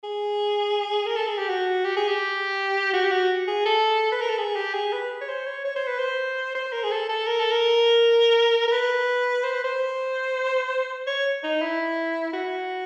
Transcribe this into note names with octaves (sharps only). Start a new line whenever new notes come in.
G#4
A#4
A4
G#4
G4
F#4
G4
G#4
G4
F#4
G4
F#4
G#4
A4
B4
A#4
A4
G#4
G4
G#4
B4
C#5
C5
C#5
C#5
C5
B4
C5
C5
A#4
G#4
A4
A4
A#4
A4
A#4
A#4
B4
C5
B4
C5
C#5
D#4
E4
F#4